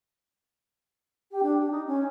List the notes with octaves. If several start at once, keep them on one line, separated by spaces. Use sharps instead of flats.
G4
D4
D#4
C#4